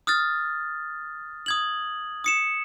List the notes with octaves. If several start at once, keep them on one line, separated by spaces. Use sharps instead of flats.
D#6 F6 F#6 A6
D#6 G#6 F#7
D#6 C#7 E7